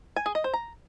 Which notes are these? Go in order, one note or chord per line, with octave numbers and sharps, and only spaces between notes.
G#5
G#4
D#5
C5
A#5